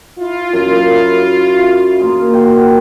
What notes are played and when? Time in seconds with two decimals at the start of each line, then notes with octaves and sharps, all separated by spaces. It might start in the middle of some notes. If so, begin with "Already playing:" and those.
0.18 E4 F4
0.53 F#2
2.00 A#3 F4 G#4
2.34 F#4 F5 G5